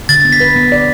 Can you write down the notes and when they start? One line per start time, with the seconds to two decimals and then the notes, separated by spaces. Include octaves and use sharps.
0.09 D3 A6
0.25 B3
0.33 B6
0.40 B4
0.56 B3
0.72 D5